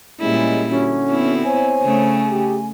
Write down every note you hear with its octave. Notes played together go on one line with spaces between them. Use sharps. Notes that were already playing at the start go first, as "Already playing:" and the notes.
A#2 G3 G#3 C#4 E4
D3 C#4 F#4
B3 C4 E4
C5 C#5 G#5
C#3 A3
G4 G#4